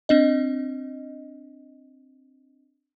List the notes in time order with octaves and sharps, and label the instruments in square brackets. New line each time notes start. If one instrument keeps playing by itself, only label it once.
[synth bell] C4 D4 D#5